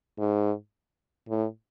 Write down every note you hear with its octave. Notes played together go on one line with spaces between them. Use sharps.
G#2
A2